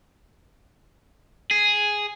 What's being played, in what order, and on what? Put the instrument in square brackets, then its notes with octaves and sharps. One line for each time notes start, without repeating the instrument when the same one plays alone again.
[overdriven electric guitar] G#4